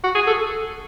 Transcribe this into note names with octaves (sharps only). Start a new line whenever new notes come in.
F#4
G#4
A4